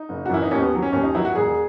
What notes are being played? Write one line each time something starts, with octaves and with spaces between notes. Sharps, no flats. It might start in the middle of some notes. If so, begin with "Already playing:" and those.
Already playing: D#4
F#1
F#4
F#2 E3 E4
D#4
D#2 C#4
B3
D#3 F#3
C#4
D#2 C#4
D#4
D#3 F#3 E4
F#4
E1 G#4